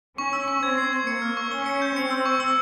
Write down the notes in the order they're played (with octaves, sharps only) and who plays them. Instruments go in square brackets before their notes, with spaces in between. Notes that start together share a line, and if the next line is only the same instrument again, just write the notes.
[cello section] C#4 [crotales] C#6
[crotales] E6
C#6
[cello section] C4 [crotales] G#6
[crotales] C7
G#6
[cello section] A#3 [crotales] C#7
[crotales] F6
C#6
[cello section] C#4 [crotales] G7
[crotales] C#7
G6
[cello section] C4 [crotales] C#7
[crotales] E6
C#6
E6